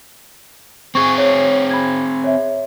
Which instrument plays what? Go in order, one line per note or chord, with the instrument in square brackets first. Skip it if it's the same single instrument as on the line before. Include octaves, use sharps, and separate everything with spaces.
[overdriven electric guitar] C4 G#4 [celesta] C#6 G#6
[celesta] C#5
B5 G#6
C#5 E5